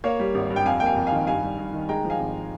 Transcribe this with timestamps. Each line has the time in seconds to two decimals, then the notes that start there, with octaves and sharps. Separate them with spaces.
0.04 A#3 C#5 F5
0.20 G3
0.35 G#1
0.50 G2
0.56 G5
0.66 F2 F5 G#5
0.80 A#3 G5
0.86 F5 G#5
0.96 F2
1.07 F5 G#5
1.12 D#3
1.27 G2 F5 G#5
1.43 G3
1.58 G2
1.73 D#3
1.89 G#3 G5 A#5
2.05 F3
2.10 F5 G#5
2.20 G#1